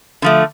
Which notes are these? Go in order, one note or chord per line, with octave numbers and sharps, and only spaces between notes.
D3 F3 A3